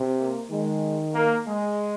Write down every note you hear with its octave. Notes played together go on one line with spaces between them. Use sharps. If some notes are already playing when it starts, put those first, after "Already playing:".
Already playing: C3
A#3
D#3 G#3
A#3
G#3